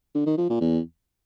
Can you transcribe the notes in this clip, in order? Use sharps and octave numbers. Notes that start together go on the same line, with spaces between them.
D3
D#3
F3
A#2
E2